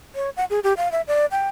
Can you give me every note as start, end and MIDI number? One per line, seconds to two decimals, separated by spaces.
0.15 0.30 73
0.37 0.45 78
0.50 0.60 68
0.64 0.73 67
0.77 0.91 77
0.92 1.01 76
1.08 1.26 74
1.31 1.48 79